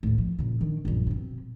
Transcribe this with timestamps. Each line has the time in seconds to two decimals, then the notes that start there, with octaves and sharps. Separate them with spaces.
0.03 D#2 A2
0.18 F3
0.39 A#2 C#3
0.61 D#3 D4
0.85 A#1 F#2
1.07 B2 C4